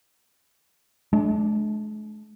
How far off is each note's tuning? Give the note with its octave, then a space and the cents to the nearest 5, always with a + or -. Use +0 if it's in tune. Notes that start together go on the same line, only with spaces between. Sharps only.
G#3 +45 D4 +0